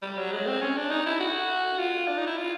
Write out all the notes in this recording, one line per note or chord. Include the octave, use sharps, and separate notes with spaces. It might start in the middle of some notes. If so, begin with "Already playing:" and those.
G3
F#3
G#3
C4
C#4
D4
D#4
E4
F#4
F4
D4
D#4
E4
F4